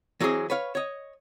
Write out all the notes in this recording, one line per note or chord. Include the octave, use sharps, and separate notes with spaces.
E3 F#3 G#3 C4 G#4
B4 C#5 F5
C#5 D#5